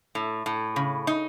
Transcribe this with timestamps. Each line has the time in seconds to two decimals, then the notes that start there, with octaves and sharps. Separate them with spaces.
0.15 A2
0.46 A2
0.76 C#3
1.07 D#4